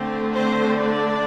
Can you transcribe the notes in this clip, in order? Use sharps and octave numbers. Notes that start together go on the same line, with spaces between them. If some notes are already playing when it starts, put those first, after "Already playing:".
Already playing: D3 A3 C4
C4 C5
D4 D5